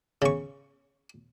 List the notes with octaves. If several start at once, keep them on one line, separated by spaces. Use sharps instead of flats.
C#3 C#6